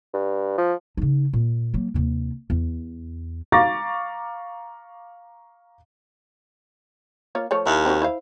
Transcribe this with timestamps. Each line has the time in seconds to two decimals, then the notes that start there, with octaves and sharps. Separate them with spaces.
0.14 G2
0.58 F3
0.97 C#3 D#4
1.33 A#2
1.74 F#3 A#3
1.94 D#2 C3
2.50 E2
3.52 F5 A#5 C#6 D6 A6 A#6
7.35 A#3 F4 C#5
7.51 F3 A3 C#5
7.66 D#2 E4
7.86 C4 D#4 F#4
8.02 E4 C5 F5